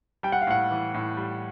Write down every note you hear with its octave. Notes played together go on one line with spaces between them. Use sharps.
G3 G5
F#5
F5
A2 F#5
E3
A2
G3